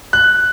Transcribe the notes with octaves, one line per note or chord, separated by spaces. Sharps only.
F#6